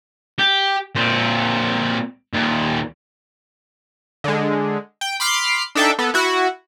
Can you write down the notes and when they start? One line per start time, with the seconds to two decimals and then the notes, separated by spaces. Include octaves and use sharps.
0.39 G4
0.95 A#2 C4
2.34 D#2 A#2
4.24 D3 G#3
5.01 G5
5.20 B5 C6 D6 F6 C7
5.75 D4 D#4 A4 E5 G5
5.99 B3 A4
6.14 E4 F#4